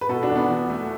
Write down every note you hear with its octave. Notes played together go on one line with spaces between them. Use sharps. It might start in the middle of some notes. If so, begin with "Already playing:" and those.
B4
B2 F#4 A4
D4 F#4
E2
B3 D4
E2
A3